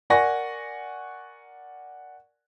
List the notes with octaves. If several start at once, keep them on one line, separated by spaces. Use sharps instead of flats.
A#4 D5 F#5 G#5 C#6 A#6